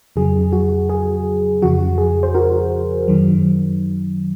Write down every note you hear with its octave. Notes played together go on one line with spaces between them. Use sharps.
F2 C#3 F#3 G#4
F#4
G#4
F2 C#3 F3 F#4
G#4
C5
F#4 A#4
F#2 D#3 F#3